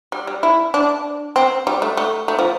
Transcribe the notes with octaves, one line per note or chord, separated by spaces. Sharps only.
G3
G3
E4
D4
C4
G3
A3
A3
A3
F3